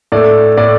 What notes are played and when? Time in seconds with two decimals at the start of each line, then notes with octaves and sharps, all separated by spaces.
0.12 A2 A3 D5
0.57 A2 A3 D5